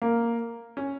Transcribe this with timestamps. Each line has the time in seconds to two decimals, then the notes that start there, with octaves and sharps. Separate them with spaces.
0.02 A#3
0.77 C#4